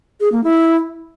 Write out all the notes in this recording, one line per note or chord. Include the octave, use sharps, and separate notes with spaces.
G#4
A#3
E4